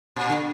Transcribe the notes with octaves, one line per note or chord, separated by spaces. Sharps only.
A#2
D3